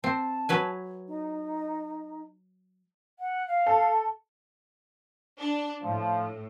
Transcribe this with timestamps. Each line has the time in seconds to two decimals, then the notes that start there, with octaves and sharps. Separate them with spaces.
0.04 C4 A5
0.49 F#3 B4 G#5
1.08 D#4
3.19 F#5
3.48 F5
3.66 A4
5.39 D4
5.82 A2 F3